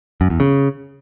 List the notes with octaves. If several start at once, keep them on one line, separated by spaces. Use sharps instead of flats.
F#2
E2
C#3